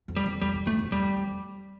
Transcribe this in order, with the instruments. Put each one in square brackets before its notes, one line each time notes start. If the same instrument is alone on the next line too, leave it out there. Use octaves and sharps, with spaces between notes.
[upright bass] F2
[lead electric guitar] G3
[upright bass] F2
[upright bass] F2 [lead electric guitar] G3
[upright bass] F2
[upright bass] G2 [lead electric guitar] A3
[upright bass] F2
[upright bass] E2 [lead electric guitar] G3
[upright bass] F2